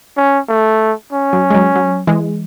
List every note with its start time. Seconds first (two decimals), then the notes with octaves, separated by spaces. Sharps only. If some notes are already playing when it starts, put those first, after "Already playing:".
0.17 C#4
0.49 A3
1.13 C#4
1.33 F#3
1.50 G#3
1.54 F#3
1.76 F#3
2.07 E3 G#3